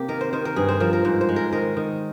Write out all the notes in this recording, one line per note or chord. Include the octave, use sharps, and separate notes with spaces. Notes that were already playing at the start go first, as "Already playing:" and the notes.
Already playing: C3 A#3 G4
D#3 A#4
C5
D#3 C5
A#4
G2 G#4
C5
F3 A#4
A#4
G#2 C5
C5
G#3
A#4
D#3 A#4
D#3